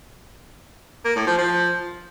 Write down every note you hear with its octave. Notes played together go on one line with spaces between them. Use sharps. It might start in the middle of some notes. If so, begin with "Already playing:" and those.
A#3
A2
F3
F3